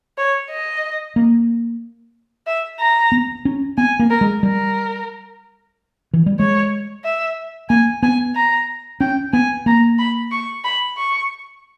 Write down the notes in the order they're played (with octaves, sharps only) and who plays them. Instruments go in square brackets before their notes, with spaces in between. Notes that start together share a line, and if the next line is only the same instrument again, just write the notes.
[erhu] C#5
D#5
[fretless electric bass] A#3
[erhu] E5
A#5
[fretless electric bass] B3
C#4
[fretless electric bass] B3 [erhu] G#5
[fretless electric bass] A#3
[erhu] A#4
[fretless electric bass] G#3
[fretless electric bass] G3 [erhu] A#4
[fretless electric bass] E3
G3
[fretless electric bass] G#3 [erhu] C#5
[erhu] E5
[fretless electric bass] A#3 [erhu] G#5
[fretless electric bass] B3 [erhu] G#5
[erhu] A#5
[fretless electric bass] C#4 [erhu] G5
[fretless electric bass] B3 [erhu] G#5
[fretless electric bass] A#3 [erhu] A#5
[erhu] B5
C#6
B5
C#6